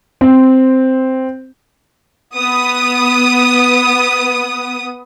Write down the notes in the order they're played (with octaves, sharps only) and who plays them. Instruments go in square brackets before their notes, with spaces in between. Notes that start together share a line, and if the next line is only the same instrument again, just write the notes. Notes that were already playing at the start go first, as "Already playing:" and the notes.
[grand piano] C4
[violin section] B3 D#6